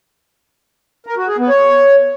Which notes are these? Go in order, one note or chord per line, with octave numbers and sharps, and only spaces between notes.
A#4
F#4
G#4
B3
C#5